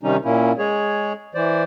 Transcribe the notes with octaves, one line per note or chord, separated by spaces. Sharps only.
C3 D#3 G3 C#4 D#4
A#2 A#3 C#4 E4
G#3 G#4 C#5
E3 C5 D5